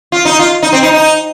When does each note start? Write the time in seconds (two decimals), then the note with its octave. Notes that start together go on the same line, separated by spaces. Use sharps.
0.12 F4
0.25 D#4
0.39 F4
0.62 D#4
0.73 C4
0.83 D#4
0.93 D#4